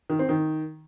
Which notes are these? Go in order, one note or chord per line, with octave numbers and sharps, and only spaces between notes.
D#3
C4
D#3